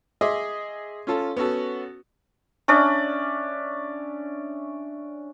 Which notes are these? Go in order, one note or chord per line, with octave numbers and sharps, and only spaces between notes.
G#4 D#5 E5 C6 D6
C#4 F4 A4
B3 C#4 F#4 A4
C#4 D4 D5 E5